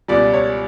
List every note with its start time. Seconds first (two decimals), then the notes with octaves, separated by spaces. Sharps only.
0.08 C#2 B2 G3 D5
0.33 C#5